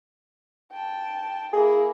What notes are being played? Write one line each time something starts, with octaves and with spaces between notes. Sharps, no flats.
G5 A5
A#3 E4 G#4